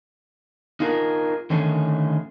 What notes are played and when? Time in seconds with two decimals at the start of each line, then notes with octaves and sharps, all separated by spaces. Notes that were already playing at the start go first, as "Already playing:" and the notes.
0.80 D#4 F4 G#4 A#4
1.50 D3 D#3 A3 C#4 G#4